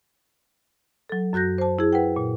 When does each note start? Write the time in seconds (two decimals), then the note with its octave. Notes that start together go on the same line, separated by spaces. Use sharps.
1.10 F#3 A4
1.33 F#2 F#4 F#6 G6 A#6
1.58 C5 A5
1.79 E4 G#4
1.93 B4 F#5 G5
2.16 A#2